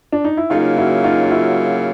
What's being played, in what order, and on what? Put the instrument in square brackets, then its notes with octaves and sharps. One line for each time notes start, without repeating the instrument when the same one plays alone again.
[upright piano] D4
D#4
E4
[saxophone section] C#3 F#3 A#3 [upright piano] D#4 F4
[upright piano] E4 F#4
D#4 F4
F4
E4 F#4